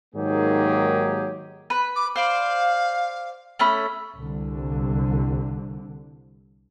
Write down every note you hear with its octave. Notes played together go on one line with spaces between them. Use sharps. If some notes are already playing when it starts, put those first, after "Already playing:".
G#2 D#3 F#3 A#3 G4 G#4
B4
D6
C5 D5 F5
A3 C#4 B5
C2 D3